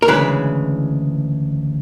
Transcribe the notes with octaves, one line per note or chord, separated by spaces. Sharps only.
A#4
D2 C#3 E3 G#3 B4